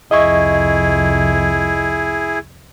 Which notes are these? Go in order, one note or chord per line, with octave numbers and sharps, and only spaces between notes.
C2 F2 E4 G#4 D#5 E5 C#6